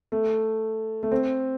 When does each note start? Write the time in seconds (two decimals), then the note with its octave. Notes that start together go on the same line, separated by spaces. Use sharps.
0.12 A3
1.03 A3
1.12 C4